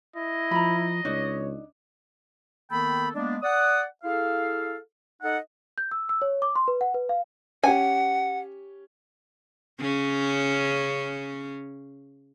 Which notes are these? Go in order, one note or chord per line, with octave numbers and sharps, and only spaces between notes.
E4 D#5
F3 A#5 B5
C#2 D4 D#4 C#5
D#3 A#3 B3 A4 G5 B5
G#3 A#3 B3 D4
D5 F#5 D#6
E4 G#4 A4 F5
D#4 A4 D#5 F#5
G6
E6
E6
C#5
D6
C6
B4
F#5
B4
F5
C#4 G4 F#5 G#5
C#3 C#4